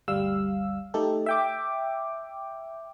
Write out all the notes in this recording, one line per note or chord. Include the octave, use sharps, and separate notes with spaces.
G1 D2 G3 F5 E6
A3 D#4 G4 A4
E5 G5 D6